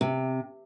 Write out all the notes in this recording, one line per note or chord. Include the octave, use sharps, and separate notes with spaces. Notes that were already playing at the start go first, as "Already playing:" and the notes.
C3